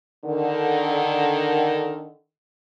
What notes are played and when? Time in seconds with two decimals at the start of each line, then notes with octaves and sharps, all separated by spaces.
0.24 D3 D#3